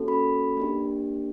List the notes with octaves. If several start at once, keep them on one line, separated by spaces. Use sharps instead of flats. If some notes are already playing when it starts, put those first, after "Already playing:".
Already playing: A#3 C#4 F#4 A4
B5
A#3 D4 G4